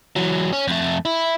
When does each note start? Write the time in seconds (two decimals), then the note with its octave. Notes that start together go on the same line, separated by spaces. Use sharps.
0.16 E3 F#3
0.53 C#4
0.68 F2 A3
1.05 E4